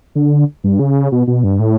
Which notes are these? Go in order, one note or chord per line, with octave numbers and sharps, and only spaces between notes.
D3
G2
C#3
B2
B2
G2
A2